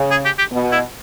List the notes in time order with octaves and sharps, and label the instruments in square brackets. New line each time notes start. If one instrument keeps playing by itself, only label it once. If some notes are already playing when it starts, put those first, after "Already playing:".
Already playing: [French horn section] C#3
[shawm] G#4
G4
G4
[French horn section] B2
[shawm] E4